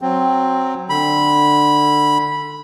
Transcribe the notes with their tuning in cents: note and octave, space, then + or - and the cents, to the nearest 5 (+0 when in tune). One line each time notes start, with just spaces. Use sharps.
F#3 +0 C4 +10
D3 +15 B5 -10